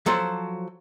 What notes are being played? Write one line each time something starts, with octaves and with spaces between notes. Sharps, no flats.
F3 F#3 A4 C5